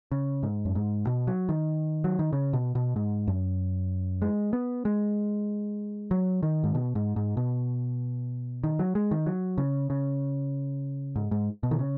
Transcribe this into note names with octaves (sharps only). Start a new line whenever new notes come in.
C#3
G#2
F#2
G#2
B2
F#3
D#3
F#3
D#3
C#3
B2
B2
G#2
F#2
G#3
B3
G#3
F#3
D#3
G#2
B2
G#2
G#2
B2
D#3
F#3
G#3
D#3
F#3
C#3
C#3
G#2
G#2
B2
D#3
C#3